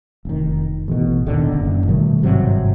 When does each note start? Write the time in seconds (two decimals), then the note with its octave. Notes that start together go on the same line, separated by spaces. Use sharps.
0.25 F1 D#3
0.88 A1 B2
1.26 D#1 D3 D#3
1.52 F#1
1.88 B2 D#3 G3 A3
2.22 G#1 G2 C3 F#3